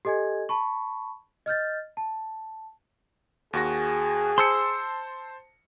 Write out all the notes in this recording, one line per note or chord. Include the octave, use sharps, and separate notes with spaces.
G4 A4 D#5 G#5 G#6
A5 B5 C#6
D#5 F6 G6 A6
A5
D#2 F#4 G#4 A#6
C5 A5 C6 E6 C#7